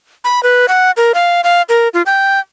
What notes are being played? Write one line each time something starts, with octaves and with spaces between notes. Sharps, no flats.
B5
B4
F#5
A#4
F5
F5
A#4
F4
G5